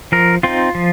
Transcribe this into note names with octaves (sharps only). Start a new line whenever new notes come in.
F3 A#4
C4 D#4 F4
F3